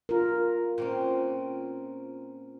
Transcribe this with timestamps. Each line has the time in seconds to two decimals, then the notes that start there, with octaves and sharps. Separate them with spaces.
0.09 F4 A#4
0.78 A#2 C4 C#4